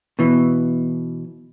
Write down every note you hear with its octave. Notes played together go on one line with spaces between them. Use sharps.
B2 E3